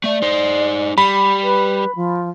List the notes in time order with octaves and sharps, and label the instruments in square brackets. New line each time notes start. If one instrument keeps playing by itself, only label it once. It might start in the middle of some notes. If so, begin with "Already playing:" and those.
[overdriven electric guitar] A3 E5 [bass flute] D5
[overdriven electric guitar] D#4 C5
[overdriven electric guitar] G3 [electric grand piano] B5
[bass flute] B4
F3